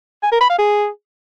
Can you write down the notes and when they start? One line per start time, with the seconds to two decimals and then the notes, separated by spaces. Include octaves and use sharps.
0.23 G#5
0.32 A#4
0.41 B5
0.50 F5
0.59 G#4